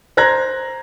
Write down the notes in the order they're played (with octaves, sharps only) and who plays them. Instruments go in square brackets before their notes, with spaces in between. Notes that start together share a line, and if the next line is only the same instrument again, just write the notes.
[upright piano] C5 A#5 F#6 G#6 A#6